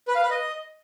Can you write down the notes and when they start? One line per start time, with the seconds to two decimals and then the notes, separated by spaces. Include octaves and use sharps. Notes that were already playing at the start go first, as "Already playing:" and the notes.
0.08 B4
0.15 F5
0.23 B4
0.30 D#5